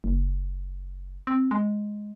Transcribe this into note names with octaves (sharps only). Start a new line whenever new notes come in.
F#1
C4
G#3